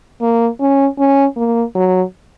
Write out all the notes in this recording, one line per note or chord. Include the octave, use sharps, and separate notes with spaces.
A#3
C#4
C#4
A#3
F#3